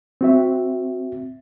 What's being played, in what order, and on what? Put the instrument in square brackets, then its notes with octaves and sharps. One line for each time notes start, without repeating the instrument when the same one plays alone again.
[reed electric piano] C4 F#4 E5